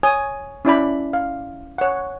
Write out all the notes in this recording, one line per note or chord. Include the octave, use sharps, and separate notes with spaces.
C#5 G#5 D#6
C#4 E4 D5 B5
F5
C#5 F#5